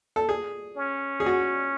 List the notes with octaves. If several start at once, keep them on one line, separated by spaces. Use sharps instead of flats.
A4
G#4
C#4
G#4
F#4